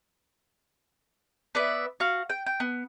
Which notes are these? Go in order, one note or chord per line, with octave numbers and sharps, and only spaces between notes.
B3 B4 D5 E5
F#4 F5
G5
G5
B3